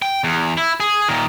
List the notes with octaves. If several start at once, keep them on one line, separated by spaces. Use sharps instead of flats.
G5
E2
E4
G#4
A#2 D#3